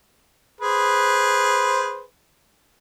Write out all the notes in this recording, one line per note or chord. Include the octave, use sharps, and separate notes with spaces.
G#4 B4 C5